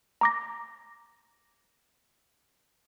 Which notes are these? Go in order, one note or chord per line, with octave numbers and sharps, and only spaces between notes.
A#5 D6 A#6